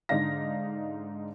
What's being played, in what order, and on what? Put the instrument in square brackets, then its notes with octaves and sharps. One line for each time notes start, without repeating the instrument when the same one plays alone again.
[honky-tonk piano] G#2 D3 D#4 D5 F5 A#6